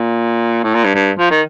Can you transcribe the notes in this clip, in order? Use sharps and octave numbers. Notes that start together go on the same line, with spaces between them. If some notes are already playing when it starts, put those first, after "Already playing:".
Already playing: A#2
A2
A#2
G2
G2
F3
D#3